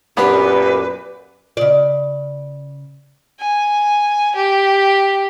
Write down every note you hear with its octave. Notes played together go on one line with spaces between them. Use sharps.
F#2 A#2 B3 D4 G4 B4
C#3 D5
G#5
G4